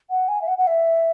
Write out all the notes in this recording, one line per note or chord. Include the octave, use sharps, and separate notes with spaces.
F#5
G#5
E5
F#5
F#5
E5